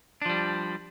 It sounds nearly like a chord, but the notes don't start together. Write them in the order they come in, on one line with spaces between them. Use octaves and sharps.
D4 F3 G3